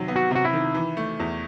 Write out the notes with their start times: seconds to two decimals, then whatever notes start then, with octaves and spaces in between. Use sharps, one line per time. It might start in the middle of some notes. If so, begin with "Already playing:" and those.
Already playing: C3 D#3 F#3
0.08 B3
0.16 F#4
0.31 C3 F#4
0.45 E4
0.53 D#3
0.74 E3
0.97 A3
1.20 E2